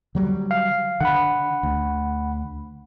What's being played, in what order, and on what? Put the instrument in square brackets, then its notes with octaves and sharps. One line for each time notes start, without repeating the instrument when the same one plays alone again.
[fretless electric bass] D3 F#3 G3
[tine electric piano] F5
[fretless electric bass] D3 [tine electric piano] F#5 B5
[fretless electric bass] D2